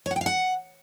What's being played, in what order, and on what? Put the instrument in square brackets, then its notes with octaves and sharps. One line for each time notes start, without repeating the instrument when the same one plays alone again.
[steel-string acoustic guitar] C#5
F#5
G5
F5
F#5